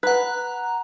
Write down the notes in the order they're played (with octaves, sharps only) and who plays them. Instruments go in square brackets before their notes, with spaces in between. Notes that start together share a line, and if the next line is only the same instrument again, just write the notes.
[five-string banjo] B4 [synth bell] F#5 F#6 [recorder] A#5